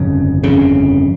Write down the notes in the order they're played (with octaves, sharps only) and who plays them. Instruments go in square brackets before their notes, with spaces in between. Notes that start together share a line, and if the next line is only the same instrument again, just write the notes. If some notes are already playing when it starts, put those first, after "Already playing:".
Already playing: [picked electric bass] G1 F2 C#3
G1 F2 C#3